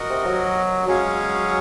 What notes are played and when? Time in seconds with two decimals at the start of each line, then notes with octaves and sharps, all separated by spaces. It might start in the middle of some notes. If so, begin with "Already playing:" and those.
Already playing: F#4 A#4 D#5 F#5
0.10 C3
0.26 F#3
0.88 F#3 G#3 C#4 G#4 C#5 F5